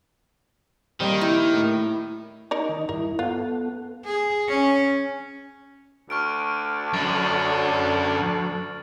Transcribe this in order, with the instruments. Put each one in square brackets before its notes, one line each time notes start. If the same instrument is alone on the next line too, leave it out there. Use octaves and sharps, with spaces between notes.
[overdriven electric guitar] D#3 [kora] G3 A#3 [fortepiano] C4
[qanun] E4
[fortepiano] A2
[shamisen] D#4 A#4 D5
[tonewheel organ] D#3 D#5
[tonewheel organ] G2 E4 [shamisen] A#4
[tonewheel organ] B3 A4 F#5 [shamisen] F4
[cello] G#4
C#4
[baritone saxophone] D2 [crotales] C#6 F6 D7
[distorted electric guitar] F#2 [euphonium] D3 [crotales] A6 F#7